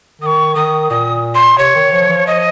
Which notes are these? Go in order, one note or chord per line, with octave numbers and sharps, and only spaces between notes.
D#3 C#6 D#6
D#3 D#6
A#2 D#6
C6
C3 C#5
D#3
F3
F3
D#5